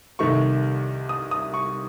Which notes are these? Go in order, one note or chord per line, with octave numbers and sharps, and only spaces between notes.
C2 C3 D#3 A3 C#6
D#6
D#6
C#6